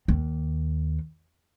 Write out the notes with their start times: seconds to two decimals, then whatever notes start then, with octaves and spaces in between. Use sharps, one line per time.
0.08 D#2